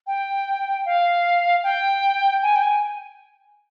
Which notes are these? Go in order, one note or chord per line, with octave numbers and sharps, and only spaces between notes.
G5
F5
G5
G#5
G5
G#5